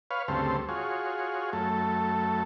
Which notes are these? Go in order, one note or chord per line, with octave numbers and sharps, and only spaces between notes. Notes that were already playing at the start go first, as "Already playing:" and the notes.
B4 C#5 F5
D2 G2 C#3 C4 A4 C5
F4 F#4 G#4 C#5
F#2 A3 A4